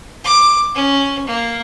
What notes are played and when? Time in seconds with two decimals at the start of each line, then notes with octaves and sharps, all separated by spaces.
0.24 D6
0.75 C#4
1.27 A#3